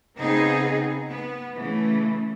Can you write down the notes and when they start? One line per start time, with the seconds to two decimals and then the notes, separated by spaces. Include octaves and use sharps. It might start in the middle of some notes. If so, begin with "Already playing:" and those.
0.17 C#3 B3 C4 D#4 G#4
1.09 B3
1.57 C#3 E3 A3